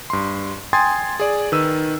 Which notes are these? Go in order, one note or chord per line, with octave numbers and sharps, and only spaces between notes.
G2 C6
G5 G#5 C6 D#6 G#6 A6
G#4 D5
D#3 B4 E6 D#7